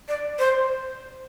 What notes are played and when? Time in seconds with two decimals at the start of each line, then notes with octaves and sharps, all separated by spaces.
0.08 D5
0.39 C5